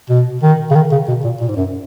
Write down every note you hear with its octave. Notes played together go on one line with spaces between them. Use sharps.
B2
D#3
C#3
D#3
C#3
B2
A#2
A#2
G#2
F#2